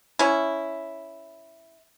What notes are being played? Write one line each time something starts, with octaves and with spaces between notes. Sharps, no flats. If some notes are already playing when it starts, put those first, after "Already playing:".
C#4 E4